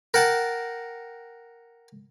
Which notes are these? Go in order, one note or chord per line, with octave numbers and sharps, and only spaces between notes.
A#4 F#5 G5 A5